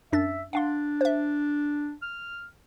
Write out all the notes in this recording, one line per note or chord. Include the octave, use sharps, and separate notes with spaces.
F#2 D4 E5 A6
D4 F5 F#5 C6
C5 E5
F6